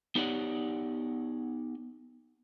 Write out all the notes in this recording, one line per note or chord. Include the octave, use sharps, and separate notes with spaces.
B3 D#4 G4 C#5 D5 F#5